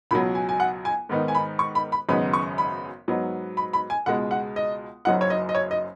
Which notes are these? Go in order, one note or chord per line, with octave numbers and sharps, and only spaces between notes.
C#2 B2 F#3 B5
G#5
G#5
F#5
G#5
G#2 D#3 B3 D#4
G#5
B5
C#6
B5
B5
G#1 F#2 C#3 B3 D#4 B5
C#6
B5
G#2 F#3 B3 D#4
B5
B5
G#5
C#2 B2 G#3 F#5
F#5
D#5
F#1 F#2 F#3 D#4 F#5
C#5
D#5
D#5
C#5
D#5